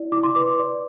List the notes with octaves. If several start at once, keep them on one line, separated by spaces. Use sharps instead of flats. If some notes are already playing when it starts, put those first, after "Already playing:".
Already playing: E4 D5
E4 D6
C6
B4 D6
D5